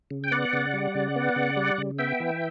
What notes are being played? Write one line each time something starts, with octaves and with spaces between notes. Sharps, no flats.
C#3
G5
B3 D5 F#5
C#3
G3
C#3
B3
C#3
G3
C#3
B3 E5 G5
E3